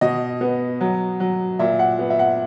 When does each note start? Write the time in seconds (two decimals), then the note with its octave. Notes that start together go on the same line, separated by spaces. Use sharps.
0.01 B2 D#5
0.41 B3
0.81 F#3
1.20 F#3
1.59 A#2 E5
1.79 F#5
1.99 B3
2.10 E5
2.19 F#5